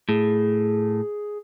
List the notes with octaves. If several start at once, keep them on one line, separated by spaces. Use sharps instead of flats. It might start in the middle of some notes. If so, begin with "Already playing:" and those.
A2 G#4